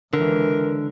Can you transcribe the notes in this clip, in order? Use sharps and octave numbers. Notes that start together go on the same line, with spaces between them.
C#2 D3 E3 A#4